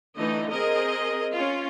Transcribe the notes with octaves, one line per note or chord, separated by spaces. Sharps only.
D3 E3 A3 D#4 D#5
C4 G#4 A#4 D#5
C#4 F4